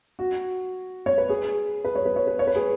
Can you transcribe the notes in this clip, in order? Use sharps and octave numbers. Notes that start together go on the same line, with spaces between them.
F#4
C#5
B4
G#4
B4
C#5
B4
C#5
B4
C#5
B4
G#4